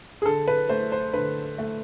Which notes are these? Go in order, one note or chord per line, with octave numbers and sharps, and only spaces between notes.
G#4
D3 A4
B4
A3 C5
C5
D3 B4
A3